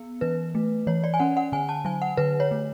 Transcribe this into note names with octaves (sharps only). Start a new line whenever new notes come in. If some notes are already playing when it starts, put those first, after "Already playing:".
Already playing: B3
E3 B4
A3
E3 C#5
D5
G#5
C#4 F#5
F#5
D3 G#5
A5
F#3 G#5
F#5
D3 B4
C#5
A3